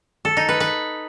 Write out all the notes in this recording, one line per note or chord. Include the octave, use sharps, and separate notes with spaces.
A4
D#4
B4
B4